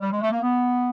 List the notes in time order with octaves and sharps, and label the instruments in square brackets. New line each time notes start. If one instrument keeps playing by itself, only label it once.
[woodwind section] G3
G#3
A3
A#3
B3